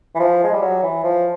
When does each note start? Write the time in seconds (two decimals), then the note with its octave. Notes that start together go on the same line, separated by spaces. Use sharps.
0.15 E3
0.19 F3
0.44 G#3
0.53 G3
0.62 F#3
0.83 E3
1.03 F3